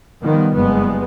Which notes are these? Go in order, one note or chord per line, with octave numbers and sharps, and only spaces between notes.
D#3 F3 G3 B3
F#1 G2 G#3 B3